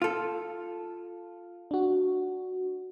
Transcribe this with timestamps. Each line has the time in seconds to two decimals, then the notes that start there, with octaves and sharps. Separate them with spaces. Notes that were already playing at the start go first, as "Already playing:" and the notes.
0.02 F4 A4
1.71 D4 F#4